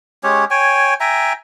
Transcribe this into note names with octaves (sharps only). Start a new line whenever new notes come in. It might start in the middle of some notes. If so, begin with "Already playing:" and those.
G#3 C#4 G4 C#5
C#5 G5 G#5
E5 G5 G#5 A#5